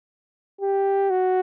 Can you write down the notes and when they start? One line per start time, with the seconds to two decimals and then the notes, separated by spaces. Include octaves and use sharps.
0.61 G4
1.10 F#4